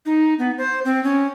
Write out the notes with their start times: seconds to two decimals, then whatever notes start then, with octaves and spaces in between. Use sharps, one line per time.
0.06 D#4
0.39 B3
0.58 C5
0.85 C4
1.04 C#4